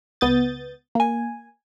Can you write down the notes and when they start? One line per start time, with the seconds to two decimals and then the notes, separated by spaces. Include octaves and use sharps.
0.21 C#2 B3 D#6 G6 A6
0.95 A#3 G#5